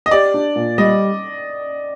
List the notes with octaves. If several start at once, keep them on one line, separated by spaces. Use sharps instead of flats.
D#5
G4 D5
D4
A#2
G3 D#5